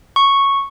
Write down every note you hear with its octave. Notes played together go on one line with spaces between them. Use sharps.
C#6